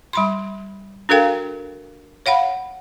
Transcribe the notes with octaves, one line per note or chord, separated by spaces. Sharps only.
G3 B5 C6
D4 F#4 A4 A#4 F5 G5
C#5 F5 F#5 B5